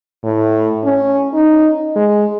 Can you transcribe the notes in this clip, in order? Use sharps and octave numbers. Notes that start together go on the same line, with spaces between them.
A2
C#4
D#4
G#3